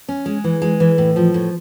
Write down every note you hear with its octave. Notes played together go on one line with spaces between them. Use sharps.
C#4
G#3
E3
G#3
E3
A2
F3
A2